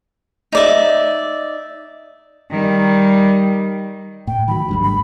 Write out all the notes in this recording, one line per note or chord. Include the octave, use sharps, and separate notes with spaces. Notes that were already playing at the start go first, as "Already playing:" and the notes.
D#4 D5 E5
D#3 G3
A2 G5
D#3 F#3 B5
G#1 D2 G2
B5